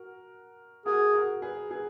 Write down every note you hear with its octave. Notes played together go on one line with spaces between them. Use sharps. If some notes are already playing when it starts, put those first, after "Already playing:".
Already playing: F#4 A#4
F#4 G#4 A#4
F#4 A#4
G#4 B4
G#4 B4